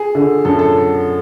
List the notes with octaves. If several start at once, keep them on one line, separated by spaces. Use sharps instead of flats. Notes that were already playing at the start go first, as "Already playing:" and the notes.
Already playing: G#4
D3
F#2 A4
A4